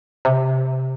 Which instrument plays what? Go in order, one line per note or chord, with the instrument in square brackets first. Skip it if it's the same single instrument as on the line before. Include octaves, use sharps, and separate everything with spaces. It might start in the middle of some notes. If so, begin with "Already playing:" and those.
[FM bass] C3